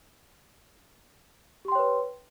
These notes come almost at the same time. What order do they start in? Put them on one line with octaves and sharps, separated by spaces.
G4 C6 G5 C#5 B4